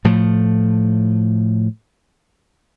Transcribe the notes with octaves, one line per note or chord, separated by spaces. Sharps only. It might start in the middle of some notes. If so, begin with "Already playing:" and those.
A2 F3 A3